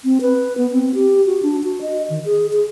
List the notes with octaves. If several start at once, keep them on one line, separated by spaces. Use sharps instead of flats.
C4
B4
B3
C4
G4
F#4
D4
F#4
D#5
D#3
G#4
G#4